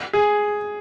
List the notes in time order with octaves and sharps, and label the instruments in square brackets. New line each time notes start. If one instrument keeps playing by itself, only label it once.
[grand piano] G#4